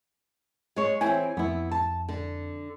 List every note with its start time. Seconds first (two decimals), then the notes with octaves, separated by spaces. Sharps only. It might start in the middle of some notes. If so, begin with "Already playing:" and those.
0.76 G#3 C#5
1.01 E3 C4 E4 C#5 G#5
1.37 F2 B3 E4
1.71 A5
2.09 D3